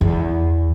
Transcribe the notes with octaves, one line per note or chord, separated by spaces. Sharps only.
E2